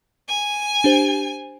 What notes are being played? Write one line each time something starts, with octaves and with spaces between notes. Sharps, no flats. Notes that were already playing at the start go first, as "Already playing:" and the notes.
G#5
D4 G4 C5